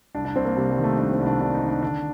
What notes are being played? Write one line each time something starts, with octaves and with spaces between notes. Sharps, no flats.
C2 D4
D4
C2 C4
A#3
C3 G3
G3
D#3
A3
C2 D4
C4
C2
D4
C3 D4
D#4
D#3
D4
D3 D4